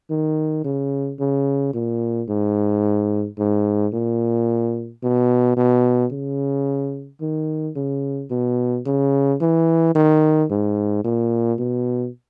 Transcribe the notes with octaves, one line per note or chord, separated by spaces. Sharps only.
D#3
C#3
C#3
A#2
G#2
G#2
A#2
B2
B2
C#3
D#3
C#3
B2
C#3
E3
D#3
G#2
A#2
B2